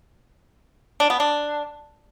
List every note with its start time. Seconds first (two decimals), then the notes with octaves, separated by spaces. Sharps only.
1.00 D4
1.10 B3
1.20 D4